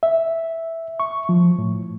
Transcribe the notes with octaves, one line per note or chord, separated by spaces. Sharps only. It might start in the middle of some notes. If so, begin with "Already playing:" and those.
E5
C#6
F3
A2